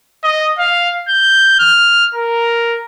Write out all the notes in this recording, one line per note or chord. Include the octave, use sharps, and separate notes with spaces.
D#5
F5
G6
F6
A#4